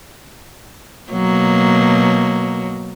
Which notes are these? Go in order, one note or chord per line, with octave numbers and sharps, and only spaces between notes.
B2 F#3 A#3